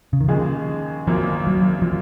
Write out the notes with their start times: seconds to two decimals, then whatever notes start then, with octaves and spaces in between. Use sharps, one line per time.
0.13 C#3
0.21 D#3
0.28 D#2 C#3 F3 G#3 D#4 G#4
1.07 G#1 F#2 D#3 F3 A#3
1.47 F#3
1.82 F3